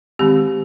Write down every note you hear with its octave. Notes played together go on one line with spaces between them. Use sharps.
D#3 G#3 C4 G4